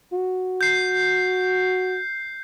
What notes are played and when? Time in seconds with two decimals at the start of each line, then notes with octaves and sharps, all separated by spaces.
0.13 F#4
0.61 G6 C7